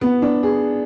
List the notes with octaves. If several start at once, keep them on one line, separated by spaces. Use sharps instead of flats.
B3
D4
G#4